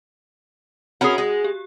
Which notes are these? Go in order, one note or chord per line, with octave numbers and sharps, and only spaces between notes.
C#4 E4 F#4 G#4 A#4 F#5
G#3
G4